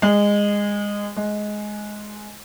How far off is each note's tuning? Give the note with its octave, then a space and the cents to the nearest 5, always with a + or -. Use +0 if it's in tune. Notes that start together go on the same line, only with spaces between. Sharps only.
G#3 -20
G#3 +10